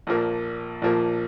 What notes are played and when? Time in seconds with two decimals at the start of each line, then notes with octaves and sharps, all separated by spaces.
0.07 A#1 A#2 F3 A#3
0.82 A#1 A#2 F3 A#3